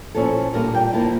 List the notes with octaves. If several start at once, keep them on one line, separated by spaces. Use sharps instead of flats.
A#2 F3 C#4 E4 A4
A#2 G3 D4 F4 A#4
G5
A#2 F3 A#3 E4 A5